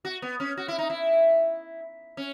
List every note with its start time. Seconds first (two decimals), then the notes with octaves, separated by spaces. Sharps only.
0.05 F#4
0.22 B3
0.40 C#4
0.57 F#4
0.68 E4
0.78 D#4
0.90 E4
2.17 C#4